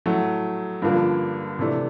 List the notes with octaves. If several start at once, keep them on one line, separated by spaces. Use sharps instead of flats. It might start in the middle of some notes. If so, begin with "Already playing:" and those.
A2 F#3 A3
G2 D3 F3 A#3
C3 E3 A3 D4